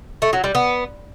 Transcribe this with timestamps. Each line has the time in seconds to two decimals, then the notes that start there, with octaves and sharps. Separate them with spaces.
0.22 A3
0.33 F#3
0.44 G3
0.55 B3